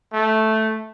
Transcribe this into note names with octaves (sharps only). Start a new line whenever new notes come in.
A3